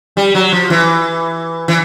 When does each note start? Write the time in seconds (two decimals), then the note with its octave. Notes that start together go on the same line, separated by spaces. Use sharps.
0.17 G3
0.35 F#3
0.52 F3
0.70 E3
1.68 E3